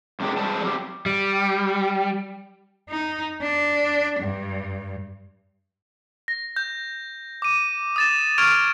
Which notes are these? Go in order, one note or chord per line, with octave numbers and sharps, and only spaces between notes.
F#2 C3 G#3 D4 G4
G3 G#3 C4 A5
F#3 C4 G4
G3
D#4
D4
G2
A#6
G6
D6 D#7
D#6 A6 E7
C#6 F6 G#6 D7 F7